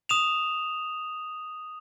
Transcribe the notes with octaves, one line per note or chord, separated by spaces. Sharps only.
D#6 E7 F7